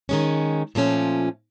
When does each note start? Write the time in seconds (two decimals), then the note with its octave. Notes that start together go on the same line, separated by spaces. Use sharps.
0.09 D#3 G#3 C#4
0.75 A#2 F3 A3 C#4 F4